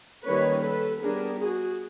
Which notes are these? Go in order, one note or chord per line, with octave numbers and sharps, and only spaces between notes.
D#3 G3 A#3 C#4 B4 C#5
A4 B4
G3 B3 D4 G#4 A#4
F#4 G#4